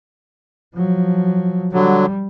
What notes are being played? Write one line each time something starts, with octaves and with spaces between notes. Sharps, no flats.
F3 F#3
D3 F#3 G3